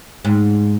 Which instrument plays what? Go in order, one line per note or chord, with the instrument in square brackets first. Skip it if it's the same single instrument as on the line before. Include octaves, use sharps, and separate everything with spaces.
[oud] G#2